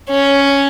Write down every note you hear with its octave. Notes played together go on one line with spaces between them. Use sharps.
C#4